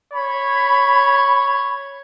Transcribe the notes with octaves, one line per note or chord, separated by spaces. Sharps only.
C#5 B5